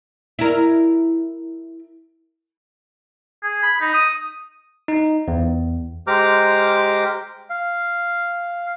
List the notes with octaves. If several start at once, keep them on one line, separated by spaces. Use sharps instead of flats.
E4 A#4
G#4
B5
D#4
D#6
D#4
E2
G#3 G4 C5 A#5 D6 F6
F5